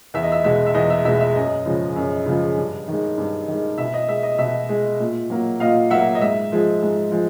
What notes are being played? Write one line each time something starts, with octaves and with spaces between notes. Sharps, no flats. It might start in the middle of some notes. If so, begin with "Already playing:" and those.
E2 E5
D#5
E5
B2 G#3 E5
E5
E2 D#5
E5
B2 G#3 E5
E5
F#2 D#5
C#3 F3 G#3
F#2
C#3 F3 G#3
G2
D#3 G#3
G2
D#3 G#3
B2 E5
D#5
G#3 E5
D#5
B2 E5
G#3
A#2
F#3 A#3
A#2 D#5 F5
F#3 A#3 E5 F#5
D#5
G#2 E5
F3 G#3
G#2
F3 G#3